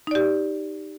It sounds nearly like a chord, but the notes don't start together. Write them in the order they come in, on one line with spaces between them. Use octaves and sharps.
D#4 D5 G4